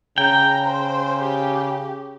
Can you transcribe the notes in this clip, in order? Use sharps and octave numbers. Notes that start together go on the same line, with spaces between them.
C#3 G5 A#5
C5
G4